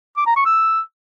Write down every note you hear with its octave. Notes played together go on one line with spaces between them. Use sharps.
D6
A#5
C#6
E6